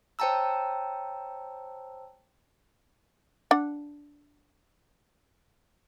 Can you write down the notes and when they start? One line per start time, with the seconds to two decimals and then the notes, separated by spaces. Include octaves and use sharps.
0.19 C5 C#5 G5 A5 A#5 E6
3.51 D4 F#5